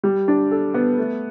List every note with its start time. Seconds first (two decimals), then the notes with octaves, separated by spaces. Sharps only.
0.04 G3
0.28 D4
0.51 A4
0.74 B3
0.98 A3